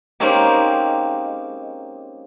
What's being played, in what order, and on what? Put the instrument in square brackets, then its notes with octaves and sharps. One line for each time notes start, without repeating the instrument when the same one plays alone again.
[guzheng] G#3 A#3 C4 C#4 D#4 G4